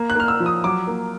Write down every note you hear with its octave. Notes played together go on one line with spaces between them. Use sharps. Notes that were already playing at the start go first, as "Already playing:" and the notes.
Already playing: A#3
F#6
A#3 F6
E6
F3
D#6
F#3 D6
A#3